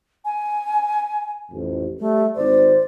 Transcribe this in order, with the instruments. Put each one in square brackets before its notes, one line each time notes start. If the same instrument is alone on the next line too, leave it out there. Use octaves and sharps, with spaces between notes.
[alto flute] G#5
[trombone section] A1 F2
[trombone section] G3 [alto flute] A3
[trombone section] G#1 C5 [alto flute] D5